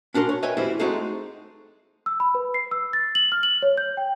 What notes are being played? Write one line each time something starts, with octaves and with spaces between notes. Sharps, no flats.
C#4 D4 F#4 A#4 C6
C#5
B4 C#5 D#5 E5 G5 G#5
F#2 E3 G3 C4 E4
G#3 A3 C4 D#4 F#4
E6
B5
B4
C7
E6
A6
F#7
F6
F#7
C#5
G6
G5